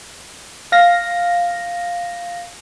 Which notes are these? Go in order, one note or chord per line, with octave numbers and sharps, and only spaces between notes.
F5 A#6